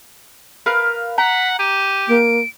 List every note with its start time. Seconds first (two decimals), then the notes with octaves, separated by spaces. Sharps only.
0.66 A#4 B4 F5
1.18 F#5 A#5 B6
1.59 G4 D#7
2.08 A#3 D7